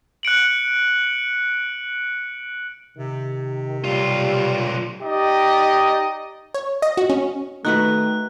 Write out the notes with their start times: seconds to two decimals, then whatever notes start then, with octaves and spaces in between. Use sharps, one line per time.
0.23 F#6 C#7 D7 F#7
2.97 C3 D#3
3.84 B1 G3 F4
5.01 D#4 G4 D5 D#5
6.54 C#5
6.82 D#5
6.97 F#4
7.10 C#4
7.65 D#3 A3 D#4 F#4 B4 F#6